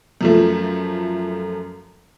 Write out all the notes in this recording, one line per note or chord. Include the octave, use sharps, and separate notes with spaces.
F#2 F3 A3